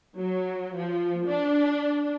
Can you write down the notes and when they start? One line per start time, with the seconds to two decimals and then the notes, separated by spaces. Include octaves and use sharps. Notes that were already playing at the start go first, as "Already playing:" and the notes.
0.19 F#3
0.76 F3
1.27 D4